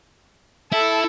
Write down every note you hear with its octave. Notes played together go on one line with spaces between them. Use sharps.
E4 A4